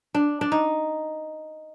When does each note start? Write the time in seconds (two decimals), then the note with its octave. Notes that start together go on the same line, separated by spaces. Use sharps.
0.14 D4
0.41 D4
0.52 D#4